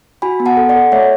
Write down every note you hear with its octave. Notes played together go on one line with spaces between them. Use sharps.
F#4 G#5 B5
B3
F#5 A5
A4
D5 F#5
A4
A3 C#5 E5